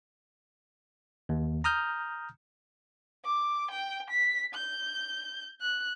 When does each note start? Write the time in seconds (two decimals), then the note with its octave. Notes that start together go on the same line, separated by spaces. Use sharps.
1.29 D#2
1.64 A#5 D#6 F6 G6
3.25 D6
3.71 G5
4.10 B6
4.54 G6
5.61 F#6